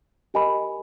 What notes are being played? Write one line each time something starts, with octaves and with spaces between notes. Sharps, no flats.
G4 A#4 D#5 G#5 B5